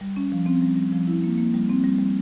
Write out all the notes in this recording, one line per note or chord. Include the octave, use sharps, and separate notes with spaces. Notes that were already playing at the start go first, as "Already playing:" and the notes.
G3
C#4
F3
C4
G3
G3
F3
E4
A#3
A#3
G3
C4
G3
G3